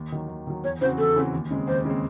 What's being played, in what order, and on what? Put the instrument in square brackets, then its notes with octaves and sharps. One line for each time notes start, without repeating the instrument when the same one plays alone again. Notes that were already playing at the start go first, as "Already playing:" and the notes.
Already playing: [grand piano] D#2
D#3 F#3
D#2
D#3 F#3
[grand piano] E2 [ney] C#5
[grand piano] C#3 E3 C4 F#4 [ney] C5
[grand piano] E2 [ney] A4
[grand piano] C#3 E3 C4 F#4
D#2
C#3 G#3 C4
[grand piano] D#2 [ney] C5
[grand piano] C#3 G#3 C4